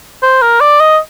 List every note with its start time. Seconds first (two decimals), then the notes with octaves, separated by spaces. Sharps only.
0.23 C5
0.42 A#4
0.60 D5
0.80 D#5